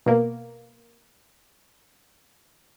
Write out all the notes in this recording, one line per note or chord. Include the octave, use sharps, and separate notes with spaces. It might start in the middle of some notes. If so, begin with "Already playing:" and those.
B2 A#3